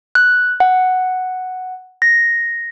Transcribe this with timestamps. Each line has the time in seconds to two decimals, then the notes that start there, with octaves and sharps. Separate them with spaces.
0.15 F#6
0.60 F#5
2.02 A#6